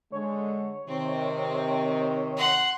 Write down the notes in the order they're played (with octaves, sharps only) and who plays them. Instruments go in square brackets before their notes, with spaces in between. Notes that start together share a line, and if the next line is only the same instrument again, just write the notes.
[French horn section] D3 G#3 [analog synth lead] C#5
[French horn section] C3 D#3 [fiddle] C4
[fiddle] F#5 C6